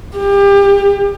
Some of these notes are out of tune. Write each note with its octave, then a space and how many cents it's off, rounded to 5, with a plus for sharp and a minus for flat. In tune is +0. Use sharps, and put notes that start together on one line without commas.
G4 +30